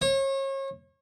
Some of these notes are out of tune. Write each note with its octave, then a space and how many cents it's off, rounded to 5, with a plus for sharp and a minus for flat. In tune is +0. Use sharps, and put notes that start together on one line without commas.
C#5 -35